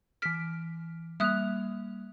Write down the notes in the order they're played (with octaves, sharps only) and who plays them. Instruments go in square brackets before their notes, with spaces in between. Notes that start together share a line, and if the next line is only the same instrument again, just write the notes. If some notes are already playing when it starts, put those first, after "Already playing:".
[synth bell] E3 D7 [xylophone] F6 B6
[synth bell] G3 A#3 F7 [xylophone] E5 D#6 F#6